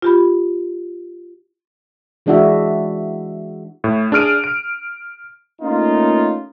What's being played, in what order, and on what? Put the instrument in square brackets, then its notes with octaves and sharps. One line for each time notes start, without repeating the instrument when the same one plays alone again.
[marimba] F4 G4 B5
[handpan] E3 G#3 D4 E4 F#4 E5
[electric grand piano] A2
D4 G#4 F6 D7 D#7
D7
[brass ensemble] A3 A#3 C#4 D#4 F4